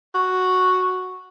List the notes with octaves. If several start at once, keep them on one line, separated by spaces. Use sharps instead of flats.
F#4